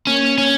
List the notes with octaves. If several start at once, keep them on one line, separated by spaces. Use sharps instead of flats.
A#3 C#4
C#4